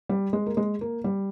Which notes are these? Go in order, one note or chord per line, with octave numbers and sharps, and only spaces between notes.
G3
G#3
A#3
G#3
A#3
G3